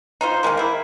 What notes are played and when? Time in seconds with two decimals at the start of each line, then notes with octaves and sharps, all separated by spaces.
0.21 D#4 F4 C5
0.43 D#3 F3 G#3 A#3
0.57 A#3 E4